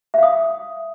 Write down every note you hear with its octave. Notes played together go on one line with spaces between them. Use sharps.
E5 F5 D#6